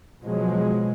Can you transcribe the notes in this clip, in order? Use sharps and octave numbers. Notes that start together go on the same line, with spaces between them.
B2 F3 F#3 G#3